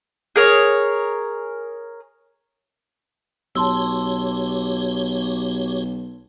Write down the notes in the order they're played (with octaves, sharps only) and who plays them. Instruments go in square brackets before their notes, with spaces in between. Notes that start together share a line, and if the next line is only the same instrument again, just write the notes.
[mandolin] G#4 A#4 C#5
[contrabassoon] B1 [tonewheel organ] F#4 G4 C#5 [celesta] A5 C6 E6